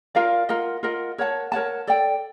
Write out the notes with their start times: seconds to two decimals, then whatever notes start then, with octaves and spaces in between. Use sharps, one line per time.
0.15 F4 A#4 D5 F5
0.49 F4 A#4 D#5 F#5
0.83 F4 A#4 D#5 F#5
1.18 A#4 C#5 F#5 A5
1.52 A#4 C#5 F#5 A5
1.87 A4 D5 G5